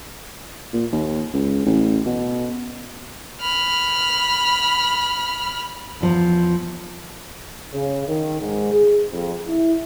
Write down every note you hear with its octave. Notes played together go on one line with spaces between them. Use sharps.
A#2
D#2
C#2
A1
B2
B5 F6
E2 F3
C#3
D#3
G#2
G#4
F2
E4